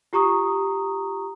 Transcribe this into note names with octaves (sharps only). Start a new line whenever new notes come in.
F4 G4 A#5 C#6 D#6